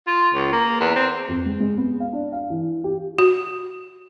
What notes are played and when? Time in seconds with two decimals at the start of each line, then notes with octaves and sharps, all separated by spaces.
0.07 F4
0.34 C#2
0.52 A#3
0.80 E2
0.95 C4
1.28 F2
1.46 G#3
1.60 G#3
1.78 B3
2.00 F5
2.13 D4
2.32 F5
2.50 E3
2.84 G4
3.19 F#4